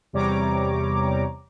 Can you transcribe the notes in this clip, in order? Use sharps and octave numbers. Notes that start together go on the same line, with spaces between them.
E2 C3 G3 C#5 A#5 D6